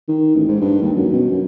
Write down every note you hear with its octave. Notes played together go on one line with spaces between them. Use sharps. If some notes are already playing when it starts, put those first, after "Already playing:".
D#3
A1
G#2
G2
D#2
F#2
B2
F#2